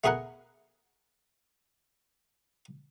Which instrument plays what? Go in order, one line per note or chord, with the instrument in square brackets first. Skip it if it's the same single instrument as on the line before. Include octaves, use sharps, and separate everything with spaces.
[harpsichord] A3 B3 G#4 A#4 F#5